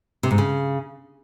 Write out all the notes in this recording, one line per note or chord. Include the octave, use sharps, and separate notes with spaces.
C3
G#2
C#3